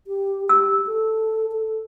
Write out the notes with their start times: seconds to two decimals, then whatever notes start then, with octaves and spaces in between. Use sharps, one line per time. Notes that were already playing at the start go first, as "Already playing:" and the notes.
0.07 G4
0.49 G4 E6
0.87 A4
1.52 A4